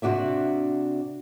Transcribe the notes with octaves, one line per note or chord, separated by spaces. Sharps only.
C3 D4 F#4 D5 E5